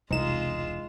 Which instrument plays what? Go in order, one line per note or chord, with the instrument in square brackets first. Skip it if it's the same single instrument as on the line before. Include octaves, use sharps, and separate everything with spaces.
[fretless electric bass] E1 [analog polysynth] C2 E7 [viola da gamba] G#3 F4 [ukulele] D#4